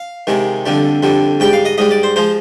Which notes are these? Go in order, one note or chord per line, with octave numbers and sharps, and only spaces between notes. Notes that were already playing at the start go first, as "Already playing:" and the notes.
Already playing: F5
C3 D#3 G#3
F2 D3 G3
F2 D3 G3
G#2 G3 G5
F5
D#5
G#2 G3 D#5
D5
C5
F3 G#3 C5